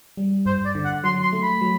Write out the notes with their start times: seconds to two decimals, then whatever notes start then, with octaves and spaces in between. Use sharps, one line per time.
0.17 G3
0.46 G2 C5
0.65 D5
0.75 D3
0.85 F#5
1.04 F#3 C6
1.23 C6
1.32 A3
1.42 B5
1.61 F#3